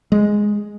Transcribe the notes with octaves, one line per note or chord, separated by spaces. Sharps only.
G#3